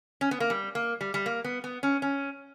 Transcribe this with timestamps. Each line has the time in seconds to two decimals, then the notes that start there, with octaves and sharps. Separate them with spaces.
0.21 C#4
0.31 B3
0.40 A#3
0.50 G3
0.75 A#3
1.01 G3
1.14 G3
1.26 A#3
1.44 B3
1.64 B3
1.83 C#4
2.02 C#4